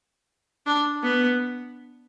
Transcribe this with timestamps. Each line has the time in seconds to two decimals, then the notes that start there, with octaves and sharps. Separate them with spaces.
0.66 D4
1.03 B3